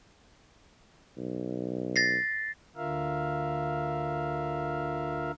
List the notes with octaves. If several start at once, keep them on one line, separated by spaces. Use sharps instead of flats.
B1
A6 A#6 C7
D2 D3 F4 A#4 E5 F5